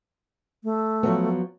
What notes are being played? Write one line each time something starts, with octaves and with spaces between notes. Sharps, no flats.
A3
F3 F#3 B3